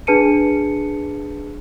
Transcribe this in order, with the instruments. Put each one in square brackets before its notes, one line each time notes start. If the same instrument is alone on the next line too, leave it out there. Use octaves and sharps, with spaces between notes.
[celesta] D4 G#4 B4 A5 C#7 D#7